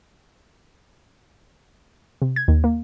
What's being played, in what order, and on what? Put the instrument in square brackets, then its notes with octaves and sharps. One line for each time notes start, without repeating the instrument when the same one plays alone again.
[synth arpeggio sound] C3
G#6
D#2
A#3